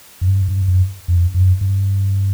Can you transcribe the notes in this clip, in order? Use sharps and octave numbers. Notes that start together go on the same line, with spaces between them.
F#2
G2
G2
F#2
F2
F#2
G2